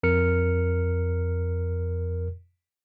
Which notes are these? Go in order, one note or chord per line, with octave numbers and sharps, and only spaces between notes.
F2 A#4 F6 C#7